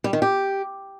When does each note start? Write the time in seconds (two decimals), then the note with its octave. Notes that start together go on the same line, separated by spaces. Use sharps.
0.04 G3
0.13 D#3
0.22 G4